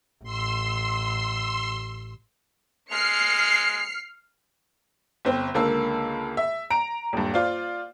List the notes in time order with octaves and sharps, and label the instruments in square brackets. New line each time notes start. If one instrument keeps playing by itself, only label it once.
[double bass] A1 [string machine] C6 E6
[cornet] G#3 [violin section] F6 C7 C#7
[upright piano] G1 C4
C#2 D3 A#3 A5 E6
E5
A#5 D7
D#1 G2
F4 C5 D5 F5